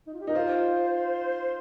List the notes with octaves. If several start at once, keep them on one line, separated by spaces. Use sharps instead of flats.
D#4
F4
G4
D#4 A#4
F4 C5